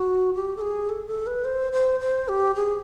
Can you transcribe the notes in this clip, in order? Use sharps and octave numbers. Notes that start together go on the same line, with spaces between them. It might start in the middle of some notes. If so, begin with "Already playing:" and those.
Already playing: F#4
G4
A4
G#4
A4
A4
B4
C5
C5
C5
G4
G#4